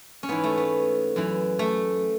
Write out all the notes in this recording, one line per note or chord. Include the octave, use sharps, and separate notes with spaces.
C#4
G#2 E3 B3
A3
B3
F#2 E3
A3